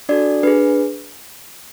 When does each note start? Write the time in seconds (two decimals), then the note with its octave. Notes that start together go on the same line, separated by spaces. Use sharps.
0.09 D4 F#4 A4 D5
0.43 D4 G#4 B4